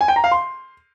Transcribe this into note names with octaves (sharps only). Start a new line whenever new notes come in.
G#5
G5
A#5
F5
C6